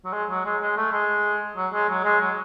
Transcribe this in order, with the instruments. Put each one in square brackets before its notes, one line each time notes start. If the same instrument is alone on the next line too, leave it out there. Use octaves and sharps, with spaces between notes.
[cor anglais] F#3
G#3
F#3
G#3
G#3
A3
G#3
F#3
G#3
F#3
G#3
F#3